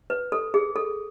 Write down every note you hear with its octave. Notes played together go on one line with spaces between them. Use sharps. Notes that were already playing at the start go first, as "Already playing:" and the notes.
B4
A4
G#4
A4